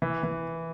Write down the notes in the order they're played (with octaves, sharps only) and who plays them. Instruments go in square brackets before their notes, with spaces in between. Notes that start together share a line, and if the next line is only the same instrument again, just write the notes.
[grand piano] E3
E3